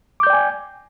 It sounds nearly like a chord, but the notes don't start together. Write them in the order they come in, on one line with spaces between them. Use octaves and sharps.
D6 G6 D5 G5 G#5